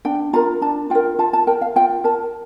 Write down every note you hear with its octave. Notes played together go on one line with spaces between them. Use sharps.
D4 G5
F4 A#4 A#5
D4 A5
F4 A#4 G5
F4 A5
A5
A#4 G5
F5
F4 G5
A#4 A5